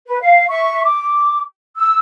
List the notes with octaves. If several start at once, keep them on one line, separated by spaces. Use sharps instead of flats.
B4
F5
E5 C#6
D6
E6